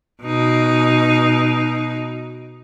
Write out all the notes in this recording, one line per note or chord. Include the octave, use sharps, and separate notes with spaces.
B2 D#4